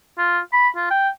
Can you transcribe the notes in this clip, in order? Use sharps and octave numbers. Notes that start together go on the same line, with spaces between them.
F4
B5
F4
G5